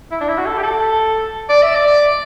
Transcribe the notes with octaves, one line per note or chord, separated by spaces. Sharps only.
E4
D4
E4
F#4
A4
G4
A4
D5
E5
D5